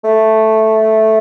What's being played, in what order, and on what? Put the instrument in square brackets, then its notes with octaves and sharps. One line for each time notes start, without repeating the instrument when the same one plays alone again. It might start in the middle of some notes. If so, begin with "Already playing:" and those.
[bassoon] A3